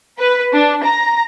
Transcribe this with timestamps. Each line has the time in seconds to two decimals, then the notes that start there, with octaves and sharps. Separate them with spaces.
0.19 B4
0.53 D4
0.83 A#5